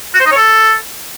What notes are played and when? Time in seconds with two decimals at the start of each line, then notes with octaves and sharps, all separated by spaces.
0.15 F#4
0.20 C5
0.26 D#4
0.31 C#5
0.37 A4